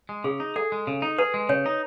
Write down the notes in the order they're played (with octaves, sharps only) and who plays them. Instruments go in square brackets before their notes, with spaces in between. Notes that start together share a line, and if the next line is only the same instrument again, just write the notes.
[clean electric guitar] G#3
[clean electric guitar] C#3 [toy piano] G#4
[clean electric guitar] D#4
[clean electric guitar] G#4 [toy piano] A4
[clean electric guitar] G#3
C#3
D#4
[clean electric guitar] G#4 [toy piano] B4
[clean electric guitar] G#3
[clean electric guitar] C#3 [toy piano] C#5
[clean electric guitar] D#4